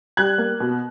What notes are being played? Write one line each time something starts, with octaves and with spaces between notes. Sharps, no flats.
G3 F#6 G#6
A#3
B2